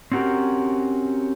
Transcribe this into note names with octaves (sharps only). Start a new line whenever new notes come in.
C4 C#4 F#4 G4 A#4